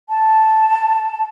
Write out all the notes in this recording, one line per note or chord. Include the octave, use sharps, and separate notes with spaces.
A5